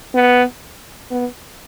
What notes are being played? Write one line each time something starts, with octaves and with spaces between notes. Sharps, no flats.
B3
B3